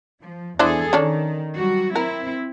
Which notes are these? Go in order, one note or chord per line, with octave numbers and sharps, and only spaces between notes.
F3
E2 D4 E4 G#4 A4 C5
D#3 C#4 D4 A4
F#3 G3 F#4
C4 E4 A#4